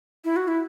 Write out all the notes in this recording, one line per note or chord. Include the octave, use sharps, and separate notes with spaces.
E4
F#4
E4